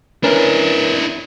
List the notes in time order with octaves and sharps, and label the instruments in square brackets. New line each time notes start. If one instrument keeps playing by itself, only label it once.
[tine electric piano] C#4 A#4 B4 [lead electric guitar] D4 E4